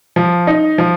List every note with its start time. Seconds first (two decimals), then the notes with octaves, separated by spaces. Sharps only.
0.16 F3
0.47 D#4
0.78 F3